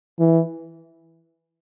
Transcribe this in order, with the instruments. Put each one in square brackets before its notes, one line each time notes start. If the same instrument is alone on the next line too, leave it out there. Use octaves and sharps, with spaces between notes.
[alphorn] E3